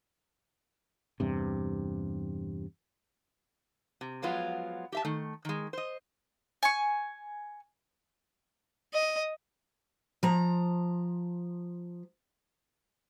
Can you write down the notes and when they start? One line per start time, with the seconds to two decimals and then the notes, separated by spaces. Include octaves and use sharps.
1.20 E2 G2 C3
4.01 C3
4.22 F3 F#3 G#3 B3 F4
4.92 G4 E5 A5
5.05 D#3 A3
5.45 D#3 G#3
5.73 C5 D#5
6.63 G#5 C#6
8.94 D#5
10.23 F3 A#5